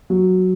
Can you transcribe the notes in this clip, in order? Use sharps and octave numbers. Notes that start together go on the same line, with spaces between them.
F#3